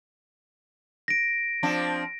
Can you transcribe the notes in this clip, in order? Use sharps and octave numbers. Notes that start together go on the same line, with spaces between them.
A#6 D7
F3 C4 D4